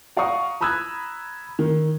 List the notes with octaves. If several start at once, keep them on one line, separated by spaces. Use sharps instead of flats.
D5 F5 F#5 A#5 C#6 D#6
A#5 B5 D#6 E6 F#6 G#6
D#3